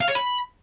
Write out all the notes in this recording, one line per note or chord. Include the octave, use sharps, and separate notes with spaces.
F5
C#5
B5